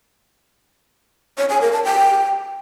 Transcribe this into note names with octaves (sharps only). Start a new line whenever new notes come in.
C#5
G#5
A#4
A5
G5